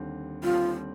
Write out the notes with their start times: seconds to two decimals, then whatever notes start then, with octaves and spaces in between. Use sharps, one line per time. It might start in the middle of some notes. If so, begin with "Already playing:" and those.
Already playing: D#2 D3 G3 C4
0.43 D#2 D3 G3 C4 F4